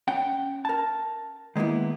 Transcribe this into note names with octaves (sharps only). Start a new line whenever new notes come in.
C#4 F#5 G5
A#4 A5
D#3 G#3 A#3 B3 E4